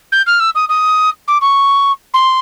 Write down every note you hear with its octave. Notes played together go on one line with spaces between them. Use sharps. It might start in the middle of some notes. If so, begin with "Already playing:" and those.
G6
F6
E6
D#6
D#6
D6
C#6
C6